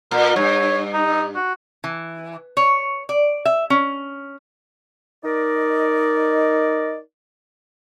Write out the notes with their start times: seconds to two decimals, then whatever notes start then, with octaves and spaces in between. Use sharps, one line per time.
0.11 A#2 A#4
0.36 G2 C#5
0.94 D#4
1.35 F#4
1.84 E3
2.57 C#5
3.09 D5
3.45 E5
3.70 C#4
5.24 D#4 A#4 D5 D#5